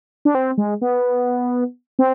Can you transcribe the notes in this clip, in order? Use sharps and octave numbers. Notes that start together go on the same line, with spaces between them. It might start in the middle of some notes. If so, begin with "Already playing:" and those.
D4
C4
G#3
B3
C4